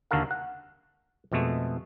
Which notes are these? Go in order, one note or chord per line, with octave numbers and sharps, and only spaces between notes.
D#2 D3 F#4 A4 A#4 F5
F#5
F2 B2 G#3 A3